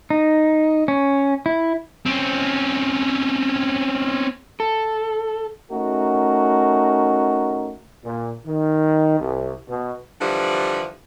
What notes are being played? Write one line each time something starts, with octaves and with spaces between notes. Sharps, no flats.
D#4
C#4
E4
C4 C#4
A4
A3 C#4 D#4 F#4 A#4
A#2
D#3
C2
B2
D3 E3 F3 G3